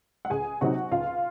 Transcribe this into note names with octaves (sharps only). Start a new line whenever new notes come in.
F#5
C#2 G#4 G#5
C3 F#3 C4 D#4 F#4 F#5
C#2 F4 F5